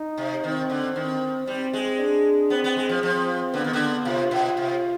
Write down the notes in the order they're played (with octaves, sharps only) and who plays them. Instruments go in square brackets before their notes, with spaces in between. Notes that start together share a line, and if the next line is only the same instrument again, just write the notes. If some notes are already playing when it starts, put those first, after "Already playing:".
Already playing: [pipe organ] D#4
[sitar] C3
[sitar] D#3 [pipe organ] C4
[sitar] D3
[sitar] D#3 [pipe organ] C4
[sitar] G3 [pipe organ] C4
[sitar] G#3
[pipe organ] D4
[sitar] B3 [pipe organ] C4
[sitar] B3
G#3
F3
[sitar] F3 [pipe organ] C4
[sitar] D3 [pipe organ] B3
[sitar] D#3
D3
[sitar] C3 [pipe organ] F4
[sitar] B2
C3